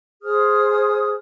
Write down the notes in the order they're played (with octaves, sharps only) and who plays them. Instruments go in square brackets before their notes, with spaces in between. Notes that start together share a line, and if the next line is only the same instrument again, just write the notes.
[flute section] G#4 C5 D#6 F6